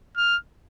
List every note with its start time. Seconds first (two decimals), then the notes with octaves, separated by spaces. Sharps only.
0.17 F6